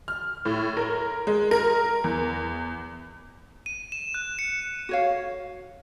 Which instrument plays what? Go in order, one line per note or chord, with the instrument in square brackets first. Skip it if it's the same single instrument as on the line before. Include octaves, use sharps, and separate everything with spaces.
[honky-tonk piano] F6
A2
A#4
G#3
A#4
E2
[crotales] D#7
E7
F#6
C#7
[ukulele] F#4 C#5 F5